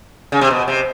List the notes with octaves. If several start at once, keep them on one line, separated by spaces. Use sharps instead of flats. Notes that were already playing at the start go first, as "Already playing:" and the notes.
C#3
C3
B2
C3